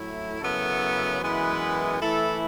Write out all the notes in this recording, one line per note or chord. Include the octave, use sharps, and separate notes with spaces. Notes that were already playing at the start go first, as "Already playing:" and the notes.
Already playing: A2 F#3 A3 E4
F#2 C#3 F#3 B3 E4 A4
F#2 E3 G#3 B3 E4 B4
E3 A3 E4 A4